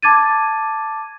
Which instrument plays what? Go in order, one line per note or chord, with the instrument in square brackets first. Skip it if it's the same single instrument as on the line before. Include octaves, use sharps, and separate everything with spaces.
[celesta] A5 D6 G#6 A6 D#7